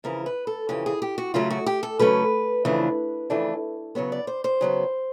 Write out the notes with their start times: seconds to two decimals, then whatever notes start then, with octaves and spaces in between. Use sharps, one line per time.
0.04 F2 C#3 E3 A#4
0.26 B4
0.47 A4
0.69 F2 C#3 E3 G4
0.86 G#4
1.02 G4
1.18 F#4
1.34 C#3 F#3 A3 C#4 F4
1.51 F#4
1.66 G4
1.83 A4
1.99 C#3 F#3 A3 C#4 B4
2.65 F2 C#3 E3 A3 D4
3.30 F2 C#3 E3 A3 D4
3.95 C#3 F#3 B3 C#5
4.12 D5
4.27 C5
4.44 C5
4.61 C#3 F#3 B3